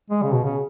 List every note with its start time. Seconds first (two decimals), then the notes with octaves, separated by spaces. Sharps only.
0.10 G#3
0.23 C#3
0.33 B2
0.44 C#3